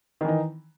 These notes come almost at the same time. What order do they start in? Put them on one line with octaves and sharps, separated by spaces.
D#3 E3 D#4